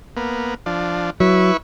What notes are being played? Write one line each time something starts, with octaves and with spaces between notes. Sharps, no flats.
A#3 B3
F3 D4
F#3 E4 B4 C#6